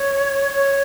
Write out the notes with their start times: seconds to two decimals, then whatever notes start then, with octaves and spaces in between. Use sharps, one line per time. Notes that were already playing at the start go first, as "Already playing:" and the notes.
Already playing: C#5
0.52 C#5